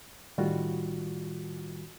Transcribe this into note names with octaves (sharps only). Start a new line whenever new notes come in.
A2 D#3 G3 F4 F#4